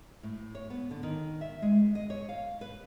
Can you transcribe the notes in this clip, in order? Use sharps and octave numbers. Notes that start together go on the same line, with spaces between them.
A2
C#5
B3
D3
D#3
E5
G#3
D#5
C#5
F5
B4